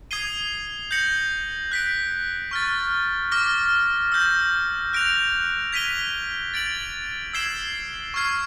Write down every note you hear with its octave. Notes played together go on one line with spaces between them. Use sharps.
D#6 G#6 C7 D#7 G7
G6 A#6 C#7 F#7
F#6 B6 D7
C#6 F6 A6
D6 F6 A#6
E6 G6 A#6
F#6 A#6 D7 F7
G#6 B6 D#7 G7
A6 D7 F#7
E6 G#6 C7 E7 G7
C#6 F6 G#6 C7